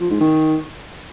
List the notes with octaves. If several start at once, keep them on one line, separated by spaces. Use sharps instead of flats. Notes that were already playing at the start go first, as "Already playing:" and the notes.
F3
G#2
D#3